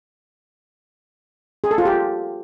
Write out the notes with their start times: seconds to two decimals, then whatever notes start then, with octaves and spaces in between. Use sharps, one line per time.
1.64 G#4
1.71 A4
1.78 F4
1.85 G4